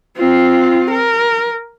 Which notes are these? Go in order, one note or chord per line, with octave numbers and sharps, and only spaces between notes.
C4 F4
A#4